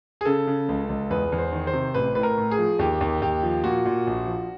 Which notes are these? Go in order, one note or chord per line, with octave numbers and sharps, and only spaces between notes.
G#4
C#3 A4
C#3
C#2
C#2
E2 B4
E2
C5
D#3
C5
C3
A1 B4
A2 B4
A#4
A2
G#4
F3
D#2 G4
D#2
D#2 G4
F3
A#2 F#4
A#2
A#1
F3